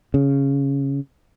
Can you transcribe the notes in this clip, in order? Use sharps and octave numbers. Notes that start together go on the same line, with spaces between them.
C#3